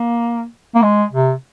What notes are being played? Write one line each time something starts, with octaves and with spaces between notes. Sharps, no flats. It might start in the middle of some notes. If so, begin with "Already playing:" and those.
Already playing: A#3
A#3
G#3
C3